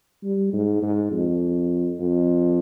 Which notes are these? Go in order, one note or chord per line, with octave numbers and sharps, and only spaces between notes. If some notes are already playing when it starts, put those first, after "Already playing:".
G3
G#2
G#2
F2
F2